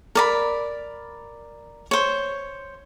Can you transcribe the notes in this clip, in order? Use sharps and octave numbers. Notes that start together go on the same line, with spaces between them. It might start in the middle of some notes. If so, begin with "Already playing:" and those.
A#4 D5 B5
C5 C#5